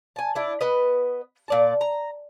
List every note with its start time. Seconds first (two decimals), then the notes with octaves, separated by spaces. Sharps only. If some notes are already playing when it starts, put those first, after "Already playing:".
0.16 G#5 A5
0.35 D4 E4
0.61 B3 B4 D#5
1.48 A#2 D5 A5
1.81 A#5